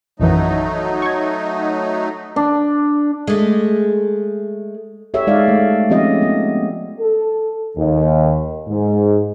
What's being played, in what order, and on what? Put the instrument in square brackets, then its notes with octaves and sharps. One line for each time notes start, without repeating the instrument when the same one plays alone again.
[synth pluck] A#1 F#2 E3 [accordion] F#3 A3 D#4
[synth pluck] C#6 G#6
[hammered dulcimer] D4
[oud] G#3 A3
[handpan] G4 A4 C#5 E5
G#3 D#4 D5 F5
A3
F3 C4 C#4 G4 D#5
B3
[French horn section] A4
D#2
G#2